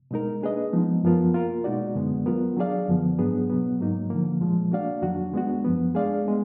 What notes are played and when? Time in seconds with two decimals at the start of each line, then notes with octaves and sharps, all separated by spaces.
0.11 B2 G#3 D#4 A#4
0.42 A#3 D4 G#4 B4 D#5
0.72 F3 G#3 B3 D#4
1.03 F#2 F3 B3 F4 A#4
1.34 A#3 F4 A#4
1.64 B2 G#3 D#4 F#4 D5
1.95 F#2 D3 G#3 B3
2.26 D#3 F#3 B3 F4 A#4
2.57 F#3 D4 G#4 D5 F5
2.88 F#2 D3 F3 B3
3.18 G#2 F#3 B3 D4 G#4
3.49 B2 F#3 B3
3.80 G#2 F#3 A#3 D#4
4.10 D3 F3 A#3
4.41 A#2 F3 G#3
4.71 A#3 D4 F#4 D5 F5
5.02 F2 D#3 F#3 D4 F#4
5.33 G#3 B3 D4 F#4
5.65 F#2 F3 B3
5.95 G#3 D4 G#4 D5 F5
6.25 G#3 B3